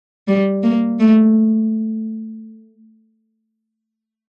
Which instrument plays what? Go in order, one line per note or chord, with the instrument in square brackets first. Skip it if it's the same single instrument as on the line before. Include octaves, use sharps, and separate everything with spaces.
[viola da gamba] G3
A#3
A3